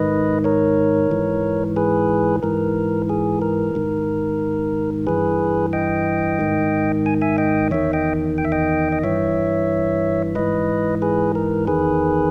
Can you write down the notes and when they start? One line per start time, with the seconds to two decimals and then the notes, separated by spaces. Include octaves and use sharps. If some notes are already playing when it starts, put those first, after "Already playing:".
Already playing: G#2 D#3 B4 D#5
0.44 A#4 C#5
1.11 G#2 E3
1.76 G#4 B4
2.43 G#2 E3 A#4
3.09 G#4
3.42 A#4
3.75 G#2 D#3
5.07 G2 E3 G#4 B4
5.73 D#5 G5
6.40 G#2 D#3
7.06 G#5
7.22 E5 G#5
7.38 D#5 G5
7.71 E2 D#3 C#5 E5
7.93 D#5 G5
8.38 G5
8.45 E5
8.52 D#5 G5
8.92 D#5
9.03 G2 E3 C#5 E5
10.35 G#2 E3 B4 D#5
11.02 G#4 B4
11.35 A#4
11.67 E2 D#3 G#4 B4